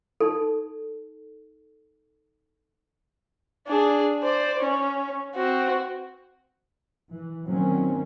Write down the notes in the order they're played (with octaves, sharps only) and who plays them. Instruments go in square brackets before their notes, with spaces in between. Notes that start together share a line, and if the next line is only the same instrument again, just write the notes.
[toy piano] D#4 A4
[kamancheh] D4 G#4
C5 D5
C#4
C4 F#4
[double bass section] E3
D3 D#3 F#3 A#3 C4 C#4